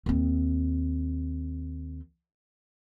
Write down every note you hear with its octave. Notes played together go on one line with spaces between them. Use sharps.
D#2 C4